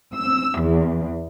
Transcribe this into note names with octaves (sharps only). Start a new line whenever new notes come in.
E6
E2